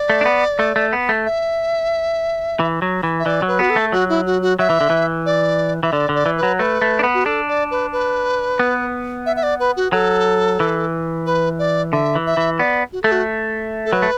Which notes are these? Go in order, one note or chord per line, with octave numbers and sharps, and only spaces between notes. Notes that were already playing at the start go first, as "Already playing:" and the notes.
Already playing: D5
A3
D4
B3
A3
A3
B3
A3
E5
E3
F#3
E3
E5
E3 D5
F#3
B4
B3 F#4
A4
A3
F#3 F#4
E4
F#4
F#4
F#3 E5
E3
D3
E3
D5
E3 E5
D3 D5
D3
D5
E3
B4
F#3
A3 B4
A3
D4
B3
F#4
D4 A4
D5
B4
B4
B3
E5
E5
D5
B4
F#4
F#3 A4
E3
B4
D5
D3 E5
E3
E5
E3
B3 D5
F#4
A3 A4
F#4
A4
F#3 B4
A3